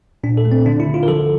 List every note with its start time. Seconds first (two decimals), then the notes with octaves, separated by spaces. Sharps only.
0.24 A#2 D4
0.37 A4
0.45 A3
0.52 C4
0.66 D3 D4
0.80 E4
0.87 D3
0.94 F4
1.03 A#4
1.08 F3 A4